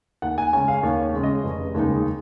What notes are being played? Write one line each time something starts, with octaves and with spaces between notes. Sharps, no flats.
D#2 F#5
G#5
C#3 G#3 C#4 G#5
F5
D#2 C#5
C#3 G#3 C#4
D#5
F1
D#2 C#3 G#3 D#4